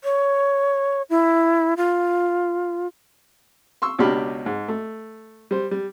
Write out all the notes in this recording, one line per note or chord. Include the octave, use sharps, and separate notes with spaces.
C#5
E4
F4
C6 C#6 E6
C#2 B2 D4 G4 B5 F6
G#2
A3
G3 C5
G3